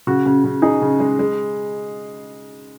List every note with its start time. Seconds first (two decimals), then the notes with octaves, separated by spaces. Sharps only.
0.07 C#3 F#4
0.26 C#3
0.44 C#3
0.62 D#4 G#4
0.82 C#3
1.00 G#3
1.19 G#3